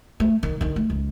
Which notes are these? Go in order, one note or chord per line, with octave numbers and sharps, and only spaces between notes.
A3
D#3
D3 D#3
A3
C#2